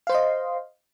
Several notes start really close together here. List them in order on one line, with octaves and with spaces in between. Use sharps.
F5 C5 C6 D#5